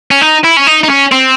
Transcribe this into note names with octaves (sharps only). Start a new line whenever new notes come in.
C#4
D#4
E4
C#4
D#4
D#4
C#4
C4